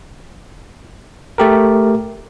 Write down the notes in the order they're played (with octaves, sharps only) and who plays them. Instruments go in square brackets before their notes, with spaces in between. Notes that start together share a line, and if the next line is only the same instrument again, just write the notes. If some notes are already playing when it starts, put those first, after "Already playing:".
[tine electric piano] A3 G4 A#4